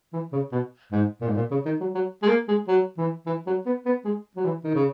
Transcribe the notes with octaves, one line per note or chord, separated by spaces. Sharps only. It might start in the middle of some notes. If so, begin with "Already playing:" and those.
E3
C#3
B2
G#2
A#2
G#2
A#2
C#3
D#3
F#3
F#3
G#3
A#3
G#3
F#3
E3
E3
F#3
B3
B3
G#3
F#3
E3
D#3
C#3